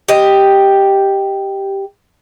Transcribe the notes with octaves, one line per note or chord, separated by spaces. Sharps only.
G4 D#5